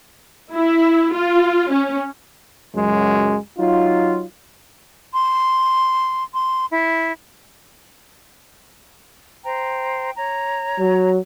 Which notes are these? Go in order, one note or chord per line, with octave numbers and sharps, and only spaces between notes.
E4
F4
C#4
C#2 F#2 F#3 G#3
F#3 D#4 F4
C6
C6
E4
C5 G5 A#5
C#5 A#5
F#3